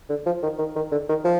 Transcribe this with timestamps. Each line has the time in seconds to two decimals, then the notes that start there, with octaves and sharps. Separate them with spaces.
0.09 D3
0.26 F3
0.43 D#3
0.58 D#3
0.76 D#3
0.92 D3
1.09 D#3
1.25 F3